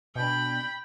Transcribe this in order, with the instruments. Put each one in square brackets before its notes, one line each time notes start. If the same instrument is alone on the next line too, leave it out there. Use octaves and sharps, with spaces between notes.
[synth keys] B2 D4 [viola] G5 B5